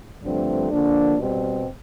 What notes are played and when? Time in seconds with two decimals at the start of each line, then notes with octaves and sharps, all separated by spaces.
0.23 G2 D3 F3 A3 C4
0.71 D3 F3 A#3 D4
1.17 B2 G3 C4